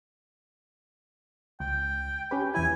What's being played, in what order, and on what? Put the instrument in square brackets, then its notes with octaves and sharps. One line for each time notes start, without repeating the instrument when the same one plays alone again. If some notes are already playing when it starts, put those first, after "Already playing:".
[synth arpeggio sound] C#2 [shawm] G5
[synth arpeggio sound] C#4 G4 B4
[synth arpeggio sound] E2 E3 E4 [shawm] G#5